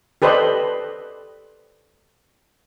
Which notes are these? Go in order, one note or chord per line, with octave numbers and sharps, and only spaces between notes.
G4 A4 B4 C5 D5 D#5